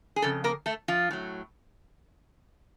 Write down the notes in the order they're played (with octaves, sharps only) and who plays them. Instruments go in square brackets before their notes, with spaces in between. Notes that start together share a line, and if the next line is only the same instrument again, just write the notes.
[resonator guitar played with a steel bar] G#4
F2 C#3 A4
A#3 A#4
A3 A4
F3 F4
A2 F#3